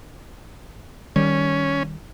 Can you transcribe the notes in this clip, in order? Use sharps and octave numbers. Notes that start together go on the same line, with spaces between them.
D#3 G3 C#4